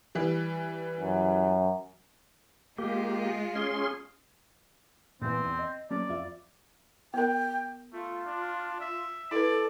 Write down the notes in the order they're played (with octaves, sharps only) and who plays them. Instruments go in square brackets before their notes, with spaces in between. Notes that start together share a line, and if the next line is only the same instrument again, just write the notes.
[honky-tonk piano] E3 G3
[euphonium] F#2
[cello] G#3 F4 [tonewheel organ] A#3 G4
[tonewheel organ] C#4 G#4 C6
[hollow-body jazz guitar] A#2 E3 B3 [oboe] C4
[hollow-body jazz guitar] E2 G#5
D#5
[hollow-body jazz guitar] F#3 A#3 C#4 [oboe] D5
[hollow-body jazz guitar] F2 F4 E5
[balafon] B3 A#4 [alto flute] G5
[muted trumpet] A3 [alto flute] F4
[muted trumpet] D4
E5
[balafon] E4 B4 [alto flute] A4 [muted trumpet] D5